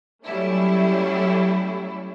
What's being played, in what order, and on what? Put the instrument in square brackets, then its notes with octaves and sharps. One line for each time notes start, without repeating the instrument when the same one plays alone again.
[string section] F#3 G3 A3 C#4 E4